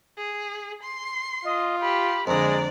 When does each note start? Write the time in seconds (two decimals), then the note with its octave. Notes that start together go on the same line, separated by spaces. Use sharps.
0.18 G#4
0.83 C6
1.45 F4 D#5
1.81 G4 B5
2.27 F2 D3 G#3 D5 A#5